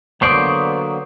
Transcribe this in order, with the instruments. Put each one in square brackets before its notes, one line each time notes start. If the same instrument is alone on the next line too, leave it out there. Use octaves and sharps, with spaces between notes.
[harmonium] D3 F#3 A#3 [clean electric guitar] B3 C5 D5 [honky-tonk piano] C#6 D#6